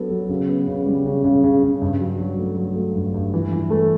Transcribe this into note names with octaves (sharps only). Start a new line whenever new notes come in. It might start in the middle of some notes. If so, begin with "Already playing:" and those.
Already playing: F#3 B3 D4 A4
F#3
C#3
B3
C#3
G3
C#3
C#3
C#3
C#3
G2
F#3
F#3
A3
F#3
A3
G2
G2
E3
E3
A3